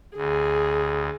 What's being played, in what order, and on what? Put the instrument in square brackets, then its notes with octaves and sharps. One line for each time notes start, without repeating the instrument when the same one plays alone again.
[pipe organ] D2 [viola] G#4